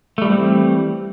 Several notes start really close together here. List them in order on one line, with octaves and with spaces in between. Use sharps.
A3 G3 E3 C4